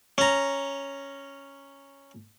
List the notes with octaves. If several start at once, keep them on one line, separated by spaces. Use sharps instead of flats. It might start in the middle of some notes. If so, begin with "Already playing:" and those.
C#4 A#5